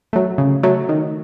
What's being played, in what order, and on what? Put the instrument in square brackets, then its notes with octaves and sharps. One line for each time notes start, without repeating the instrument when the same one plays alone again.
[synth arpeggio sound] F#3 A3
C#3
F#3 A3
D#3